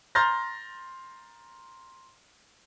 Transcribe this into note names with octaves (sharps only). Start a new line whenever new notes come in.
A#5 C6 F6 G6 A6 A#6